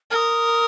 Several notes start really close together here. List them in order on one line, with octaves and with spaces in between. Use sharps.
A#4 F6 D#6